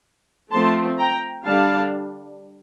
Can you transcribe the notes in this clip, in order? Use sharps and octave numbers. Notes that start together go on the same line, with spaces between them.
F3 A3 C4 A5 C6
G5 A#5
D3 G3 D4 F5 A5